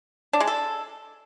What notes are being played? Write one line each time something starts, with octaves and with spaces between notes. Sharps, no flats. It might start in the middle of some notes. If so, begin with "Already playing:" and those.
D4
G#3
A4